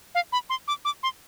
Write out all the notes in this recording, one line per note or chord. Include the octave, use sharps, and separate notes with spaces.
F5
B5
C6
D6
D6
C6